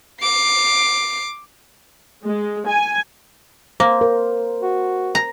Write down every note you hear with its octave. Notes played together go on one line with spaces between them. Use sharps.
D6 C7
G#3
G#5
A#3 C5
A#4
F#4
A#5